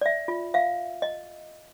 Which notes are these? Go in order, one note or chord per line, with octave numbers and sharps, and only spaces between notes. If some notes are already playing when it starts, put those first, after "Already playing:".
D5 E5
F4
E5 F5
D#5